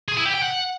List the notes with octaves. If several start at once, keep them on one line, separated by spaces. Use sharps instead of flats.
G#4
E4
G4
G5
F#5